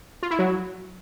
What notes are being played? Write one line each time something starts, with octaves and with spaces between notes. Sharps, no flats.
F4
E4
F#3